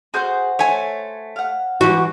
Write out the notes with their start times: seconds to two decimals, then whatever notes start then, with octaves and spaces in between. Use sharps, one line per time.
0.14 F#4 G#4 C5 F#5 G6
0.59 A3 C#5 G#5
1.36 F5 F#5
1.81 G#2 E3 F#4 D6